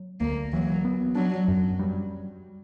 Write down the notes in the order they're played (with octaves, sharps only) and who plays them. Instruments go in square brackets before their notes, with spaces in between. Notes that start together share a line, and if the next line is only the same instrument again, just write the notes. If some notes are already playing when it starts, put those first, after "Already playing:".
Already playing: [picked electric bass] F#3
[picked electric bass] D2 [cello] A#3
[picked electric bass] E3 [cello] F#3
[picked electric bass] B3
[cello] F#3 [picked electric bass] D4
[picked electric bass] F#2
G3